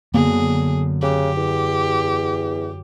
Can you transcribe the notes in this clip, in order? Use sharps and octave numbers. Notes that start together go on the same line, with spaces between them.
F#2 D3 A#3 B3 G#4
C#3 G4
E2